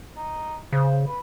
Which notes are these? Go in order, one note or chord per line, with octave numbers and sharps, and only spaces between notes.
D#4
C#3 C5
B4